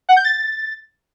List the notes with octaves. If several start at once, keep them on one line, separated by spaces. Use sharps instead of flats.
F#5
G6
A6